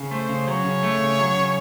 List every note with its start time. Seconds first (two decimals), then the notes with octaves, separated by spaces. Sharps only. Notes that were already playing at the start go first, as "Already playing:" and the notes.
Already playing: C#3
0.11 A3 C5
0.29 C#3
0.47 F#3 C#5
0.65 C#3
0.83 A3
1.00 C#3
1.19 F#3
1.37 C#3